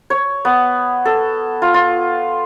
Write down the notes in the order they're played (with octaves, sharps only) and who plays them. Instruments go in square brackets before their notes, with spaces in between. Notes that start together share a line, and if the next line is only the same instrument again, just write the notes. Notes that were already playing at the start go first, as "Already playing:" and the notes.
[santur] C#5
B3
A4
F4
F4